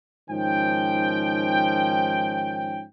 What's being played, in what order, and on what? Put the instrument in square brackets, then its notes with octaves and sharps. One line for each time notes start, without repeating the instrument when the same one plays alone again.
[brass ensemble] G#2 D#3 F3 C#4 G5